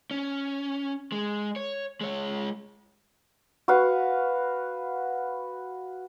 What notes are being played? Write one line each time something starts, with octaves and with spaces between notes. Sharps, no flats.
C#4
G#3
C#5
G#3 C#5
F#4 B4 F5 C#6